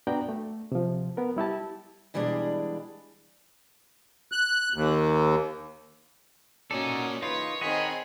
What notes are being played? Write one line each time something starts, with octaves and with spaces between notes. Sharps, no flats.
B3 D4 F#4 D5 G5 A#5
A3
C3 F3
B3 A#4
G3 E4 G4 A5
B2 E3 G3 G#3 D4
F#6
D#2
A#3 C#4 D#4 F#4 A4 D5
C#3 E3 A#3 D#4 F4 B4 C#5
D#3 C4 G#4 D#5 F#5 B5